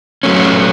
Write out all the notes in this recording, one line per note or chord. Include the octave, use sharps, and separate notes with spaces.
F#3 A3 C#4